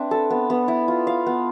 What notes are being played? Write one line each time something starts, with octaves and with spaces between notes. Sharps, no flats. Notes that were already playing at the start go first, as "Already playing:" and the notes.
Already playing: C4 D4 B4 E5
A4
B3
B3
E4
F4
F5
B3